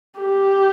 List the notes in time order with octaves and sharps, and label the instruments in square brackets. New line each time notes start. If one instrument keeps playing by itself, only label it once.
[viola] G4